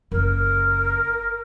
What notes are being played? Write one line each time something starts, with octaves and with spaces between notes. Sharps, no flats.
F#1 A#4